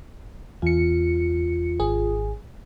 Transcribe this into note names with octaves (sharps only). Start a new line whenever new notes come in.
E2 F4 C#7
G#1 G#4